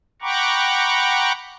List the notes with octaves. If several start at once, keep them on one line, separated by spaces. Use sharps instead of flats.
F#5 G5 A#5 B5 C#6 D6